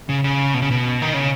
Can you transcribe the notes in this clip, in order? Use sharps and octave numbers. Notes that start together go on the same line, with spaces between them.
C#3
C#3
B2
C#3
B2
D#3
C#3